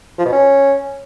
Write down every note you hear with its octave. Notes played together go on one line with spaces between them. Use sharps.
F3
B2
C#4